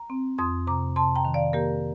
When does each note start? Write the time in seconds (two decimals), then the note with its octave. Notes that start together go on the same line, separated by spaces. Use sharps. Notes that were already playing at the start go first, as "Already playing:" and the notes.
Already playing: A#5
0.10 C4
0.38 F2 C6 D#6
0.67 C3 A#5 D6
0.96 C3 A5 C6
1.15 G5 A#5
1.25 D#3
1.34 D5 F5
1.53 A#3 G4 A#4